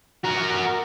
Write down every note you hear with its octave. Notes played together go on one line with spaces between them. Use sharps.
F#4 A#4